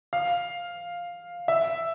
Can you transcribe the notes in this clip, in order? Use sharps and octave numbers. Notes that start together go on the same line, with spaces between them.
F5
E5